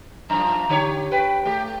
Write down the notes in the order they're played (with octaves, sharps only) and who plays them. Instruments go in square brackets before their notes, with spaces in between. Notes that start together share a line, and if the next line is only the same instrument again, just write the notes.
[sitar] F#2 F3 [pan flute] A#5
[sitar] D3 G4 C#5
[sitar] B4 [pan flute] G5
[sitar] A3 G4